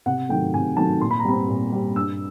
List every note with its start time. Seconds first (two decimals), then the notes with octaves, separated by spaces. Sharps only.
0.06 C3 F#5
0.29 D#3 F#3 A3 G5
0.54 C3 G#5
0.77 D#3 F#3 A3 A5
1.01 A#2 C6
1.11 B5
1.19 A#5
1.25 G3 C4 B5
1.48 A#2
1.72 G3 C4
1.95 G2 E6